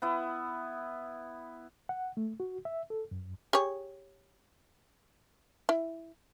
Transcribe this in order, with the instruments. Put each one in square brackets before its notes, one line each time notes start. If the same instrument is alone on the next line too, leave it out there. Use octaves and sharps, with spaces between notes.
[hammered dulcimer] B3 E4
[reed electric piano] F#5
A3
F#4
E5
A4
F#2
[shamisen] G4 G#4 C#5
E4